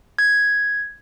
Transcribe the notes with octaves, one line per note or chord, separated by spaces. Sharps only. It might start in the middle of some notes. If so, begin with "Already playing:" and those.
G#6